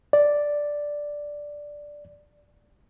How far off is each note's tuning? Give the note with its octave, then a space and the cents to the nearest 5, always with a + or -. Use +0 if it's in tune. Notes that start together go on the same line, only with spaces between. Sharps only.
D5 +0